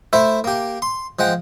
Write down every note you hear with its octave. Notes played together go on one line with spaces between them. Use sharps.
A3 E4 C5 E5
A#3 G4
C6
F3 G#3 F#5 G5